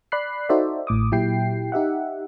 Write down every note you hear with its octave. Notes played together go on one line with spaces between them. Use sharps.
D5 B5 F#6 C7
D#4 F#4 A4 C5 D5 E5
A1 A2 D6 D#6
A#2 F#3 E4 G4 G5 C7
D#4 G4 E5 F#5